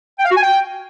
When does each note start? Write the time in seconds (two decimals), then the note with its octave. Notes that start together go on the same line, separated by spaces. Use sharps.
0.19 G5
0.25 F5
0.31 F#4
0.37 G#5
0.43 G5